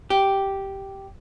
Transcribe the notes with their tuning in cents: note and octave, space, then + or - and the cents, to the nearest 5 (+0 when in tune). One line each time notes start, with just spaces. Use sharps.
G4 -5